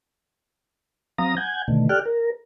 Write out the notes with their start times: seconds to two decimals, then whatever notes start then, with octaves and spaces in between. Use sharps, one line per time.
1.18 F#3 C4 F5 A#5 D#6 A#6
1.37 F#5 G#5 G6 G#6
1.68 B2 D3 D#3 A3
1.89 G4 A4 D5 G5 F6 F#6
2.06 A#4